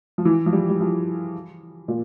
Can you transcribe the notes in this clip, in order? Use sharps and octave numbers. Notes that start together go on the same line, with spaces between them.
F3
E3
F3
G3
G3
F3
A#2